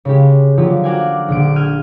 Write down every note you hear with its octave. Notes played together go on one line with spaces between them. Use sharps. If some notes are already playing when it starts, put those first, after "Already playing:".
C#3 G#3 G4
D3 F3 F#3 A#3 F4 G4
F#4 A#4 D5 F5 G5 G#5
A#1 D3 D7
E6 F6 G6 G#6 D#7